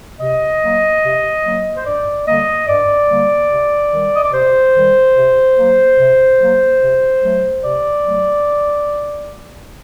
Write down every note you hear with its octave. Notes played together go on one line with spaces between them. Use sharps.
C3 D#5
F#3 A#3
C3
F#3 A#3
C5
G2 D5
D3 G3 A#3 D#5
G2 D5
D3 G3 A#3
C3
D#3 G3
D#5
D5
C3 C5
D#3 G3
C3
F#3 A#3
C3
F#3 A#3
C3
F#3 A3
C3 D5
F#3 A3